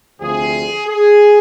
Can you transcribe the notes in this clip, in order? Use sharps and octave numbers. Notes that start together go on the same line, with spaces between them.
D2 C3 F3 G#4
G#4